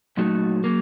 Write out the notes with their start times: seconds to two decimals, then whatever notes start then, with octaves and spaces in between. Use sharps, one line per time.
0.17 A#2 F#3 A3 D#4 F#4
0.64 F#3 A#3